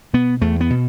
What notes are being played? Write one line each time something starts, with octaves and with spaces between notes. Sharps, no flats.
B2 B3
E2 A3
B3
B2